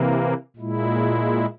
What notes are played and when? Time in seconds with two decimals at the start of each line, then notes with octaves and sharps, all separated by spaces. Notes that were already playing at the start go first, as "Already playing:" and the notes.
Already playing: C3 E3 A#3
0.56 A#2 G#3 E4